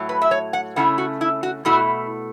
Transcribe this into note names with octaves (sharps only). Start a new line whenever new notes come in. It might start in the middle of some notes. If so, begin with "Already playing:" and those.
Already playing: A2 F#3 A3
B4
E5
C#5
F#5
C#3 A3 C#4 E4 F#5
F#4
E4
F#4
B2 A3 E4 F#4